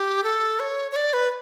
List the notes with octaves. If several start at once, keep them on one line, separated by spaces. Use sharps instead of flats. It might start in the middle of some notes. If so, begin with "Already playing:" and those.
Already playing: G4
A4
C#5
C#5
D5
B4